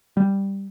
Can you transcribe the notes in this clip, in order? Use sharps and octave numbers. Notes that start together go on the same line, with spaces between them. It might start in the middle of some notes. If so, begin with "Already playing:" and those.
G3